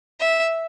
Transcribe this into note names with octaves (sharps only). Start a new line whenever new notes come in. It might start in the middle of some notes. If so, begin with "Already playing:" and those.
E5